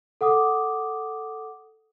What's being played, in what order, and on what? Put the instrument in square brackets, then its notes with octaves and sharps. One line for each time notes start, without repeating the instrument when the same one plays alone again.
[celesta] A4 F#5 D6 D#6